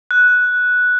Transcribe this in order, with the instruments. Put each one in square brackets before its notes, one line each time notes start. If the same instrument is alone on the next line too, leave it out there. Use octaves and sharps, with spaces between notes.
[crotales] F#6